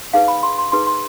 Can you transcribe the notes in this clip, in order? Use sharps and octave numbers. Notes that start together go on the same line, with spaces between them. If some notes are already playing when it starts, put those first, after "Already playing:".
D#4 G#4 B4 F5
B5
C6
C6
D#4 G#4 B4 C6
C6